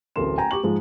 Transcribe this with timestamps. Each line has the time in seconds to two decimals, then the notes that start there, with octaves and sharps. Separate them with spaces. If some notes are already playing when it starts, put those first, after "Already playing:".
0.16 D1 A1 A4 A#4 C6 E7
0.38 G5 G#5 A#5
0.51 G4 C#6 F#7
0.63 G#2 F3 G#3